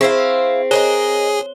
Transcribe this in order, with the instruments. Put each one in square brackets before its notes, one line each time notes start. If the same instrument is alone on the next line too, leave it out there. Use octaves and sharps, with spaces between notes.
[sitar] C4 [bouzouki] E4 C5 F5 [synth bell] G#4
[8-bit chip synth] G#4 [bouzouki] A#4 B4 D#5 [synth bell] C#5 G7